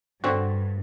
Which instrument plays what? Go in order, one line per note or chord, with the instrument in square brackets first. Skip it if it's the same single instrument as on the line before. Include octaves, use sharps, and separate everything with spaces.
[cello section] G2 [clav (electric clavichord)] D3 C4 F#4